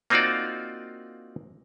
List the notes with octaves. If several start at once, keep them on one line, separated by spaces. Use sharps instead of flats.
A#3 C4 D#4 F4 F#4 D5